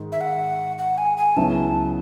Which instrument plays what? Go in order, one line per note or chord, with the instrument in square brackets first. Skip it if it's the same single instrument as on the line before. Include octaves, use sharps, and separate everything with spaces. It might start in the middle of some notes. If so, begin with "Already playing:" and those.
Already playing: [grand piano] G#2 D#3
[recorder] E5
F#5
F#5
G#5
G#5
[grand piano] C#2 C#3 F#3 B3 E4 [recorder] A5